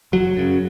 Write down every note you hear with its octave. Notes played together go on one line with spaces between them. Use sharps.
F#1 F#3
F#2 C#3